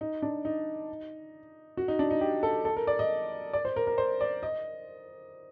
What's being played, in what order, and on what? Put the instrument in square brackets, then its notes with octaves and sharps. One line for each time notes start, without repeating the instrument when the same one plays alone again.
[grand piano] D#4
D4
D#4
F#4
D#4
D4
D#4
G4
A4
A4
A#4
D5
D#5
D5
C5
A#4
A#4
C5
D5
D#5